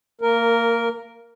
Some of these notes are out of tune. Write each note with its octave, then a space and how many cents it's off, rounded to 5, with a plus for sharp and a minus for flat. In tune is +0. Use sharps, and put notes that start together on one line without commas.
A#3 -20 A#4 +0